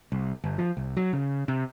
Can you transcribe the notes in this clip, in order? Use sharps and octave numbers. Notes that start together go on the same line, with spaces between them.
C2
G1
F3
C2
F#3
C#3
C3